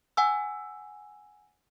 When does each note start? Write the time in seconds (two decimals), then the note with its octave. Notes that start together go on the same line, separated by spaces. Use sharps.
0.17 F#5 G#5 E6